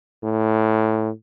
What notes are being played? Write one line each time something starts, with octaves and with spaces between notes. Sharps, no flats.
A2